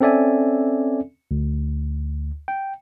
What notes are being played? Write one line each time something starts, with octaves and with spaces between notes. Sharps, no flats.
C4 C#4 A4 D5 E5 G#5
D2
G5